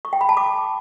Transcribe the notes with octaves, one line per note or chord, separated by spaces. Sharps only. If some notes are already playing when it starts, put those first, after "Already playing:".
C#6
G5
B5
A5
D6